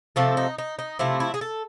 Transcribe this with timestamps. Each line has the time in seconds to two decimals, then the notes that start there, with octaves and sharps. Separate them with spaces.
0.16 C3 F3 A3 A4
0.37 D#4
0.58 D#4
0.79 D#4
0.99 C3 F3 A3 E4
1.20 E4
1.34 G#4
1.41 A4